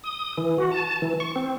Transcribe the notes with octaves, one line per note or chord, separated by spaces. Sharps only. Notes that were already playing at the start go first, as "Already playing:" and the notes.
D#6
E3
F#4
A5
E3
C#6
C4